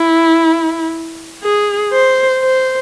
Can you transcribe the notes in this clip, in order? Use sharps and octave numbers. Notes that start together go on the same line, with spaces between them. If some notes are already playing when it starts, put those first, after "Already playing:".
Already playing: E4
G#4
C5
C5